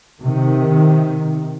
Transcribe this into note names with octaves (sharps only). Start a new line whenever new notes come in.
C3 D#3